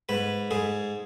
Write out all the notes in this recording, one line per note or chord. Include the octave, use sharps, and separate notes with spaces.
G#2 B4
G#2 G#4